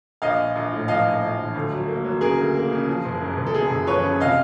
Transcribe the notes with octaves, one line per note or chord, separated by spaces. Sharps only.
A#1 D#5 F5
A#1
A#1
A2
F3 D#5 F5
A#1
A#1
F3
D2
F#3
A#3
F#3
C#3 G#4 A#4
D2
A#3
C#3
F3
F#1
F#2
F#1
A4
F#2 G#4
F#1
F3 B4 C#5
C#3
C3 D#5 F5